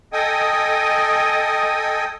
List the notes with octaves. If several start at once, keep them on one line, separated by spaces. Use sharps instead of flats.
A4 D#5 G5 G#5 D#6